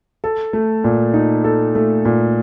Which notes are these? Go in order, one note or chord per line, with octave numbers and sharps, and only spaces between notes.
A4
A3
A#2
D#4
A4
A3
A#2